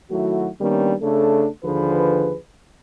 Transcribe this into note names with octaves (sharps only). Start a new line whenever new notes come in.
D#3 F#3 A3 E4 F#4
D#3 G3 A#3 B3 C#4 D4
C#3 A3 D4 A4
D#2 D3 F3 G#4 B4